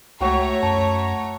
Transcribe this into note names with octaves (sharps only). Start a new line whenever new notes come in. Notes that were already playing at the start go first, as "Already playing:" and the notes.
C#2 A3 F#4 C#5 G5 A#5
F#2 A5